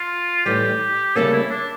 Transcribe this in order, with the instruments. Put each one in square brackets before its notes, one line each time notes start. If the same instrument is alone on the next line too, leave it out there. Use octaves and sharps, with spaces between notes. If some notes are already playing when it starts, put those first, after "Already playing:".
Already playing: [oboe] F4
[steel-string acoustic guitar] A2 E3 G3 [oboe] G4
[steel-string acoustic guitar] D2 C#3 G3 A#3 C#4 [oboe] A4
[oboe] E4
D4